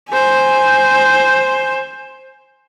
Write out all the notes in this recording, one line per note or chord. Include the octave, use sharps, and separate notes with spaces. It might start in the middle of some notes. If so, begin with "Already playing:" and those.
C5 G#5